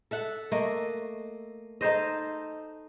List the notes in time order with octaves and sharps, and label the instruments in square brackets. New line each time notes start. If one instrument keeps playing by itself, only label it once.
[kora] A4 E5 F#5
A3 A#3 D#5
D#4 A4 C5 D#5